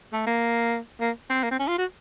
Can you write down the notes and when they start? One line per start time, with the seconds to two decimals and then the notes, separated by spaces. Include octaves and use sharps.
0.13 A3
0.26 A#3
1.00 A#3
1.30 C4
1.43 A#3
1.51 C4
1.59 C#4
1.68 F4
1.78 F#4